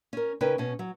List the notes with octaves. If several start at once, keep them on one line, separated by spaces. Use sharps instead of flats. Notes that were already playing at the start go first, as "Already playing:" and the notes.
C#4 A#4
C#3 C#4 D#4 A#4 B4 G5
B2 C#4
F#3